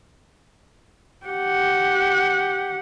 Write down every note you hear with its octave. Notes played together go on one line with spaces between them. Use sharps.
G4 F#5